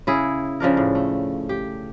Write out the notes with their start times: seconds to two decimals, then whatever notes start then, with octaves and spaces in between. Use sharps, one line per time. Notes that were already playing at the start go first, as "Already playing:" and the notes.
0.07 C#3 E4 G#4
0.60 C#3 F3 D4 A#4
0.77 A2
0.95 A3
1.49 G4